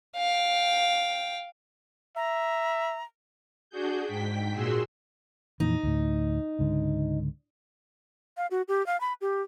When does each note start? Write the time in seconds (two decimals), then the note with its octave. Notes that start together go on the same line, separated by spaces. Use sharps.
0.17 F5 G5
2.16 E5 A#5
3.70 D4 F#4 G#4 G6
4.06 G#2 G5 B6
4.52 A#2 F#4 G#4 C6 E6
5.60 F2 A#2 E3 D#4
5.83 D2 A2
6.59 C#2 G#2 D3
8.37 F5
8.51 F#4
8.68 G4
8.86 F5
9.01 B5
9.21 G4